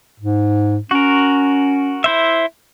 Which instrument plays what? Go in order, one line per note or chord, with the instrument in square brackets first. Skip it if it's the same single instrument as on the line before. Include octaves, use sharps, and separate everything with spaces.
[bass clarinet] G#2
[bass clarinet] C#4 [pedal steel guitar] F#4 A#4
[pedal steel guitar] E4 C5 E5